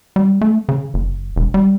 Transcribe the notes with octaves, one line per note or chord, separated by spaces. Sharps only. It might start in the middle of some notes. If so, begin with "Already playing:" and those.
G3
A3
C#3
F#1
E1
G3